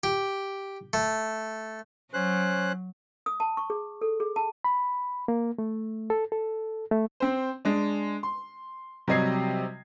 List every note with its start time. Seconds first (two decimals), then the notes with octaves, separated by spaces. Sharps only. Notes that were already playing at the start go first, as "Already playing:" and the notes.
0.04 G4
0.93 A3
2.14 F#3 C#4 C5 F#6
3.26 D#6
3.40 A5
3.57 C#6
3.70 G#4
4.01 A4
4.20 G#4
4.36 A5
4.64 B5
5.28 A#3
5.58 A3
6.10 A4
6.32 A4
6.91 A3
7.20 C4 C5
7.65 G#3 D4
8.23 C6
9.08 C3 F#3 G3 D#5 G#6 C7